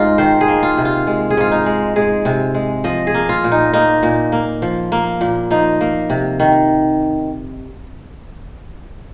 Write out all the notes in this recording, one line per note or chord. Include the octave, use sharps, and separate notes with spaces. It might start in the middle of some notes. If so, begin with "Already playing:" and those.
Already playing: G#2 G#3 D#4 F4
D#3 C5
G#4
A#3
F4
C3
F4
G#3
G#4
G#2 F4
D#4
G#3
G#3 G#4
C3
G#3
F3 D#5
G#4
A#3
F4
A#2
D#4
A#3 D#4
A#2
A#3
F3
A#3
A#2
F3 D#4
A#3
C3
D#3